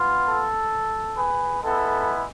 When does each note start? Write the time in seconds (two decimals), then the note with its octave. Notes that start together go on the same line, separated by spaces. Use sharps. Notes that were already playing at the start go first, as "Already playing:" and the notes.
Already playing: B3 F4
0.27 A4
1.16 G#4 B4
1.61 G#3 B3 E4 A4